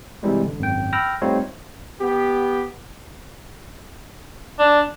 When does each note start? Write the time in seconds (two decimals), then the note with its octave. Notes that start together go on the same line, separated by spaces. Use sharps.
0.23 C3 E3 G3 G#3
0.45 G#1 D3
0.59 G#1 F#2 G5
0.93 G5 B5 E6 F6 A#6
1.22 G3 A3 C4 D#4 F4 C#5
2.01 B3 G4
4.59 D4